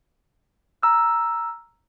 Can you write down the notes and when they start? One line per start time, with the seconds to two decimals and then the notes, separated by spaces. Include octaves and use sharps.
0.83 A#5 E6 F6